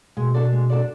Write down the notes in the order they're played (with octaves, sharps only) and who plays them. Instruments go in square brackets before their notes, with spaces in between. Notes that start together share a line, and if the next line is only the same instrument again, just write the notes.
[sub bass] B2 [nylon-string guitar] G#3
[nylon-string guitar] D4 F#4 A4 D5
G#3
D4 F#4 A4 D5